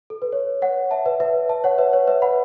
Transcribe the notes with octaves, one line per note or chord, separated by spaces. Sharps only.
A4
B4
C#5
C#5 F#5
E5 A5
B4 E5
B4 E5
E5 A5
C#5 F#5
B4 E5
C#5
B4 E5
F#5 B5